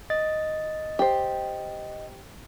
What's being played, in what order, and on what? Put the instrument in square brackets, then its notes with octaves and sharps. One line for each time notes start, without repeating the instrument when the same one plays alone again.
[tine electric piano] D#5 A6
[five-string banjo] G4 C5